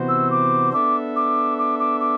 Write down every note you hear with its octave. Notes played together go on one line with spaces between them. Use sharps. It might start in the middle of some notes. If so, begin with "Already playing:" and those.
Already playing: C3 E3 B3 F#4 C5
E6
D6
B3 D4 A4 E5 D6
D6
D6
D6
D6